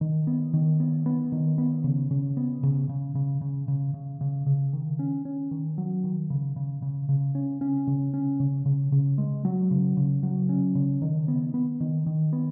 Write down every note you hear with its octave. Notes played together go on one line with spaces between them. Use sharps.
D#3
B3
D#3
B3
B3
D#3
B3
C#3
C#3
B3
C#3
C#3
C#3
C#3
C#3
C#3
C#3
C#3
D#3
C#4
C#4
D#3
F#3
D#3
C#3
C#3
C#3
C#3
C#4
C#4
C#3
C#4
C#3
C#3
C#3
G#3
F#3
C#3
C#3
F#3
C#4
C#3
D#3
B3
B3
D#3
D#3
B3